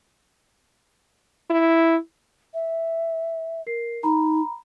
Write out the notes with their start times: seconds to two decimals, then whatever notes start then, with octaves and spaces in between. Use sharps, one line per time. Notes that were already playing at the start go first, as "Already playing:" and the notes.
1.50 E4
2.54 E5
3.67 A#4 C7
4.03 D#4 A#5 B5